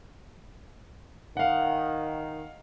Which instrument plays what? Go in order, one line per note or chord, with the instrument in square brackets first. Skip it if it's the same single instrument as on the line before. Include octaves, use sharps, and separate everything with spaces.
[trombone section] D#3 [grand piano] F5 F#5